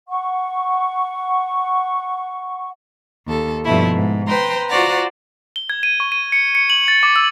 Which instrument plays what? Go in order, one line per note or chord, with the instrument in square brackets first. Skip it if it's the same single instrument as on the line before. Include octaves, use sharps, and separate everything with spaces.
[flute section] F#5 C#6
[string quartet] D#2 A4
G2 B2 F3 A3 E4
G#2
B4 C5 G5 A#5 C6
F4 F#4 C5 D5 F#5 A#5
[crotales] G7
G#6
D#7
C#6
D#7
C#7
C#7
F#7
A6
D6
E6